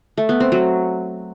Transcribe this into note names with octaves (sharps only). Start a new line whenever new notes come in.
A3
B3
C4
F#3